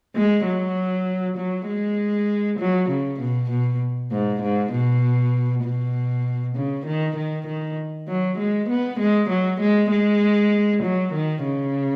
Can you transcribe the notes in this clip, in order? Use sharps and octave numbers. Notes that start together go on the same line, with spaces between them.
G#3
F#3
F#3
G#3
F#3
C#3
B2
B2
G#2
G#2
B2
B2
C#3
D#3
D#3
D#3
F#3
G#3
B3
G#3
F#3
G#3
G#3
F#3
D#3
C#3